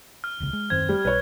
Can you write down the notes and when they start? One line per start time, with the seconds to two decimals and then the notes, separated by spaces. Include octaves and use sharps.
0.24 F6
0.40 D#1 C#2 C#3
0.53 G#3
0.70 D#1 F#2 D#3 C4 G#6
0.89 G3
1.05 B1 B2 G3 B4 C#5